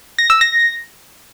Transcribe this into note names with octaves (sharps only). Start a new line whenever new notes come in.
A#6
E6
A#6